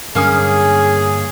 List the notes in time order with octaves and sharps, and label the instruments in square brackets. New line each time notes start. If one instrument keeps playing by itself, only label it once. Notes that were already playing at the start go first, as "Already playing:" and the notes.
[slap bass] G2 D3 F#3 [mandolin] A#3 C#4 D#6 [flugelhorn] G#4